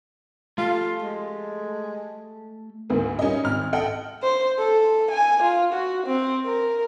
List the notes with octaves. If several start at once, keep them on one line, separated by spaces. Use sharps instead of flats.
A3 F4 G4 A4
G#3
D2 G#2 A#3 B4
G3 C#4 D#4 A#4 D#5
G#1 F6
A4 D#5 F#5 G5
C5
A4
G#5
F4
F#4
C4
A#4